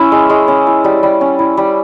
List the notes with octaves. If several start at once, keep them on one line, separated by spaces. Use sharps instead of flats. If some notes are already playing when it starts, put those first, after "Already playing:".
Already playing: C#4 E4 E5
G#3
G#3
C#4
E4
G3
G3
C#4
E4
G3